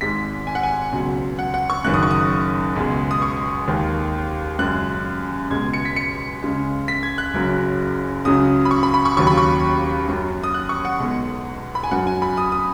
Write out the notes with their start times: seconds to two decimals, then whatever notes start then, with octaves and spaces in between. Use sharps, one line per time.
0.01 G#1 G#2 G#3 B6
0.47 G#5
0.55 F#5
0.63 G#5
0.93 C#2 B2 F#3
1.39 F#5
1.54 F#5
1.70 C#6
1.84 F#1 F#2 D#3 F#6
1.94 D#6
2.03 C#6
2.11 D#6
2.76 C#2 B2 G#3
3.11 D#6
3.22 C#6
3.68 D#2 D#3 G#3
4.59 F#2 C#3 G#3 F#6
5.51 C#2 B2 G#3 G#6
5.74 C#7
5.85 B6
5.96 C#7
6.42 C#2 C#3 G#3
6.88 B6
7.03 G#6
7.18 F#6
7.34 F#1 F#2 F#3
8.25 C#2 C#3 F#3 D#6
8.65 B5
8.71 C#6
8.83 B5
8.94 B5
9.05 C#6
9.17 D#2 C#3 F#3 C#6
9.27 B5
9.37 C#6
10.08 F#2 F#3
10.44 D#6
10.54 F#6
10.69 C#6
10.85 F#5
11.00 B1 B2 G#3
11.75 B5
11.83 G#5
11.91 F#2 F#3 F#5
12.07 G#5
12.22 B5
12.37 D#6
12.52 D#6